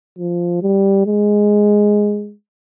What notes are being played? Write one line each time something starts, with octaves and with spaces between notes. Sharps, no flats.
F3
G3
G#3